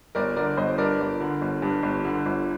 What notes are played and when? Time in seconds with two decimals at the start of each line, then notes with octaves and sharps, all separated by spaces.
0.15 G1 A#4 D5
0.36 D3 A#4 D5
0.57 G1 C5 D#5
0.78 G2 A#4 D5
1.00 G1
1.20 D3
1.41 G1
1.62 G2
1.83 G1
2.04 D3
2.26 G1